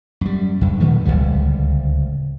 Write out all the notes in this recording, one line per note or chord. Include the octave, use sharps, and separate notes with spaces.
F#2 G3
E2 G2
A#2 D#3 F3 A3
D1 G#1 C#2 G3